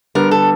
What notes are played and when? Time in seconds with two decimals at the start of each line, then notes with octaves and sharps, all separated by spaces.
0.15 D3 G3 B3 A#4
0.31 A4